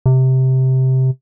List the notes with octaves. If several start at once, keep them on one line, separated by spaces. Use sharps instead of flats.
C3